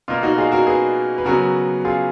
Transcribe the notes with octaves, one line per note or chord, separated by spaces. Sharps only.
B2 A#3 F4
D#4 F#4
F4 G#4
F#4 A#4
G#4 B4
B4
C#3 F#3 B3 F#4 A#4
F4 G#4